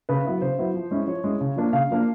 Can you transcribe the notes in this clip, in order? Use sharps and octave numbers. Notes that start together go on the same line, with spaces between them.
C#3 B4
F#3 B3 E4
C#3 C5
F#3 B3 E4
F3
G#3 C#4 E4
F3 C#5
G#3 C#4 E4
C#3
F3 A#3 D4
C#3 F5
F3 A#3 D4